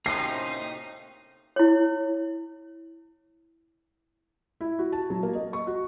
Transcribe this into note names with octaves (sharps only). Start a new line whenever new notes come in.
A2 C3 A#3 C#4 D#4 F#4 C5 C7
E4 C#5
E4
F#4
A5
F#3
A#3
D#5
C#6
F#4